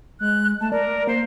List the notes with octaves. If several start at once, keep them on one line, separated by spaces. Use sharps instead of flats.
G#3 F#6
A3 A5
A#4 D5
A#3 C5